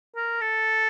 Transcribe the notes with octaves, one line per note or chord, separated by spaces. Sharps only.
A#4
A4